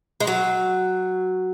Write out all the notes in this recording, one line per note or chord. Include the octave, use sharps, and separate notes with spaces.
G#3
F#3